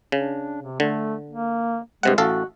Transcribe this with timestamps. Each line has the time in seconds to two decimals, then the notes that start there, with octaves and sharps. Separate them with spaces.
0.12 C#3 D4
0.62 C3
0.80 D3 A3
1.30 A#3
2.03 G2 C3 G#3 F#5
2.18 A1 F#4 A4 F5